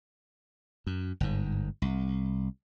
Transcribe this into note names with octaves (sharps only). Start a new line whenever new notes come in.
F#2
G1 G#2
C2